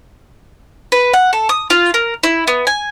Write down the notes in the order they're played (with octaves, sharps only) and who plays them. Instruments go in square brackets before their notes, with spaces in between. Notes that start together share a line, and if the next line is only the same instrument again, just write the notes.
[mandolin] B4
F#5
A4
D#6
F4
A#4
E4
B3
G#5